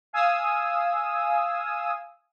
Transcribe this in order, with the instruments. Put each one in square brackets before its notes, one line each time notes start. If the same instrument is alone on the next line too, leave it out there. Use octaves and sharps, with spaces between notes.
[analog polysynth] F5 G#5 D#6 E6